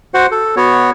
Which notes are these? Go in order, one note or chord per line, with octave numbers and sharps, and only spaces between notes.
F#4 C5 F#5
A4
B3 F#4 C#5